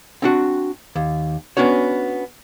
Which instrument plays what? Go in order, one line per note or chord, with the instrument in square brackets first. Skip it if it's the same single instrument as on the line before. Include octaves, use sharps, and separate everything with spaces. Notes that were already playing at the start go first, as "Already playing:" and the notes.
[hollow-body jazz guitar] C4 D4 F#4
D#2
B3 C#4 D4 F#4 C#5